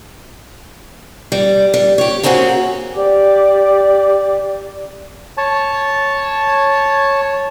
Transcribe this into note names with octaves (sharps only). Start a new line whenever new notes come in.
G3
G3
G4 C#5
A#3 C4 C#4 E4 F#4 G#4
G4 D5 D6
C#5 A5